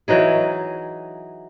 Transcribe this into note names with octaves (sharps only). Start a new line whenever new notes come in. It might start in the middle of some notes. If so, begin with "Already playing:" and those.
E3 F#3 D#4 G#4